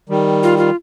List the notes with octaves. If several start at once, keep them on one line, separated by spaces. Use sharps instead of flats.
D#3 G3
F4
F4